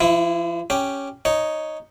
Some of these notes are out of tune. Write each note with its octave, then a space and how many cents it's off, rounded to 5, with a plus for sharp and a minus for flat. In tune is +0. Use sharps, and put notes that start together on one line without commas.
F3 -45 E4 +0
C#4 +0 G4 +0
D#4 +0 C#5 +0